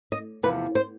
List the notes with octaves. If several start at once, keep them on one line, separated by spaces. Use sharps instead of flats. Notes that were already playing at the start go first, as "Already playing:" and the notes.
D#5
E2 C3 F3 B4
C5